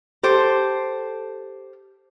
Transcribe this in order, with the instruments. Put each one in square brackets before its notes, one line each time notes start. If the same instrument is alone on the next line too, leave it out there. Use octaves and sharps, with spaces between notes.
[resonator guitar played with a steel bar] G4 A4 C5